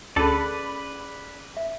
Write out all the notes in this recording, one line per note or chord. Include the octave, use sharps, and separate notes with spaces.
D2 C#4 G#4 A4 B4 D5 B5
E5